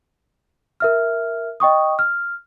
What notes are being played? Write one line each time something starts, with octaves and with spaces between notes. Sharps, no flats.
A#4 E5 F6
D#5 G5 C#6 D#6
F6